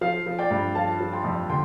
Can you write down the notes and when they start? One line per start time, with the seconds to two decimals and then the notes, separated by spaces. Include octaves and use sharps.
0.01 F3 F5
0.26 F3
0.39 D5 G5
0.51 G2
0.75 F3 F5 A5
1.00 F3
1.13 G5 C6
1.24 F2
1.49 D3 G5 C6